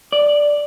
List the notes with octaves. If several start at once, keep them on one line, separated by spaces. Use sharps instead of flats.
D5